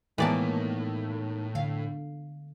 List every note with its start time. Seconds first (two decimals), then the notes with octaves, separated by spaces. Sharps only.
0.18 A2 D#3 E3 G#3 A#3 B3 D5 A5
1.55 D3 F5